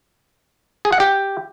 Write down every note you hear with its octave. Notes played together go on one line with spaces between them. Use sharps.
G#4
F#5
G4